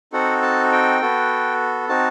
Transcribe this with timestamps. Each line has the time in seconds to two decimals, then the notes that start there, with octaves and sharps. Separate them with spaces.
0.13 C4 D#4 F#4 A4 F#5
0.42 A5
0.72 G5
1.01 B3 F#4 A4
1.89 C4 D#4 F#4 A5